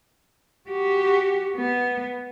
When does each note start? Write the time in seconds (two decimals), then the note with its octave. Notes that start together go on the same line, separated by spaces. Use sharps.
0.69 F#4 G4
1.56 B3